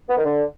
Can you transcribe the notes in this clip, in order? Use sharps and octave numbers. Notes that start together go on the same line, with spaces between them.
B3
D#3
D3